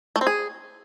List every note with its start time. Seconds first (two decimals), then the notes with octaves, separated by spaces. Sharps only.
0.16 A3
0.21 C4
0.27 G#4